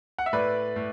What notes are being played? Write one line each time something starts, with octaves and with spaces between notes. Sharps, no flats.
F#5
E5
A2 B4 D5
A2